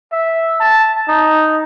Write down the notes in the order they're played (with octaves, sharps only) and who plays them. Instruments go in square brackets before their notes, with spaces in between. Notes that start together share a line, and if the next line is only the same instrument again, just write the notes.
[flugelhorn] E5
A5
D#4